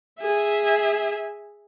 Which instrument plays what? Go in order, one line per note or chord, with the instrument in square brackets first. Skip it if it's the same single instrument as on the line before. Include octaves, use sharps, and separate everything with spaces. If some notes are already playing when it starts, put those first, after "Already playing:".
[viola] G#4 E5